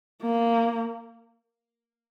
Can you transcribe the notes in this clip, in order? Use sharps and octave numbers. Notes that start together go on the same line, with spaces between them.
A#3